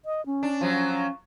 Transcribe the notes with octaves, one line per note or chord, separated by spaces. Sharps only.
D#5
C#4
D4
F3 F#3